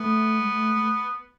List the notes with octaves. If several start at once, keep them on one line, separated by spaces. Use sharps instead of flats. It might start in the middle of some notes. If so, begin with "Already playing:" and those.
Already playing: A3 B3
G#3
A3
A3